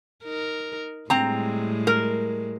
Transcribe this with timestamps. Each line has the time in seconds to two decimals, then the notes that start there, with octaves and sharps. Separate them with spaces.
0.25 D#4 A#4
1.10 A2 G3 G#3 C4 A#5
1.87 A#4